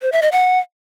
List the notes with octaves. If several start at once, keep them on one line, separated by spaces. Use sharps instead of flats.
C5
E5
D#5
F#5